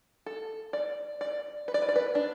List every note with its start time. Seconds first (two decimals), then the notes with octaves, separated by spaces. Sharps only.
0.26 A4
0.73 D5
1.21 D5
1.68 B4
1.74 D5
1.82 B4
1.89 D5
1.96 B4
2.15 D4